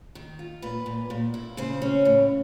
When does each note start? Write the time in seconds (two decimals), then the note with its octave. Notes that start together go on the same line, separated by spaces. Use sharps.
0.15 D#3
0.39 F4
0.62 A#2 B4
0.86 A#2
1.10 A#2
1.34 E4
1.57 C#3 C5
1.82 C#4
2.05 A2